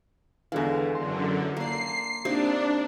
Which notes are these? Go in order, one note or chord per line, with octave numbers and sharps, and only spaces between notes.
E2 D3 E3 G#3 F5
F#2 D3 C6
A#3 D4 C7
C3 A#3 D4 D#4